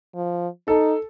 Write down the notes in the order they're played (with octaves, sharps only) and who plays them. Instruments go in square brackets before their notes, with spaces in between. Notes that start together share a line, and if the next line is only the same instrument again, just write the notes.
[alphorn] F3
[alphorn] D#4 [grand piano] A4